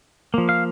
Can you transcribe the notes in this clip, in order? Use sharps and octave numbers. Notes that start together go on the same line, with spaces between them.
F3 A#3
F5